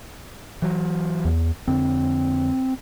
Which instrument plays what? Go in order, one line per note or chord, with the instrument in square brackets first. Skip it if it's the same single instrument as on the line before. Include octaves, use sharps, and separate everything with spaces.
[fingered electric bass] E3 F#3
[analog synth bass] E2
[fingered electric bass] F2 D3 [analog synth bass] C4